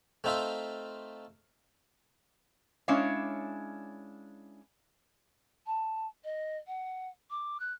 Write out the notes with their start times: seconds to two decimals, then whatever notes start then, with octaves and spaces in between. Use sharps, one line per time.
0.24 A3 C4 D#4 F4 E5
2.88 G#3 C#4 D4 E4 C#5 F5
5.66 A5
6.24 D#5
6.67 F#5
7.30 D6
7.60 F#6